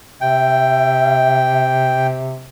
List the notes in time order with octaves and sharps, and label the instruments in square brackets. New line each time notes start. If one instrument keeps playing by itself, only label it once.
[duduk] C3 [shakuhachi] E5 [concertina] G5